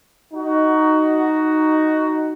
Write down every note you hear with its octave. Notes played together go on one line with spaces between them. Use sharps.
D#4 F#4